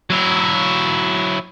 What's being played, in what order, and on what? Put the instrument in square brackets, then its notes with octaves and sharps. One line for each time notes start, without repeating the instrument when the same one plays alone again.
[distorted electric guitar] F#3 E4